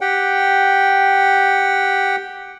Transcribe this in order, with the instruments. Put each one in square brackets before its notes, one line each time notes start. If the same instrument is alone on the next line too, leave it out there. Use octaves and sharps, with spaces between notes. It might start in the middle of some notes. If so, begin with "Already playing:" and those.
[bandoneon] G4 F#5 G5